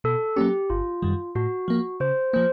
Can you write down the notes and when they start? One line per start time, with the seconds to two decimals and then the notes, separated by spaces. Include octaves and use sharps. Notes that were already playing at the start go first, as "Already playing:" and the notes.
0.04 B2 A4
0.36 F#3 A#3 C#4 G4
0.70 G1 F4
1.02 F#2 D#3 G3
1.35 A2 F#4
1.68 F3 A#3
2.00 C#3 C5
2.33 F3 A#3 C5